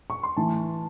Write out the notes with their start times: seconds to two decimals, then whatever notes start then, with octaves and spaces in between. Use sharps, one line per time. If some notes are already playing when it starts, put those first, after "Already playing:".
0.10 C#6
0.23 C6
0.37 A2 E3 A5